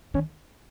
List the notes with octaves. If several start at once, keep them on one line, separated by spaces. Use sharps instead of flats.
D#3 C#4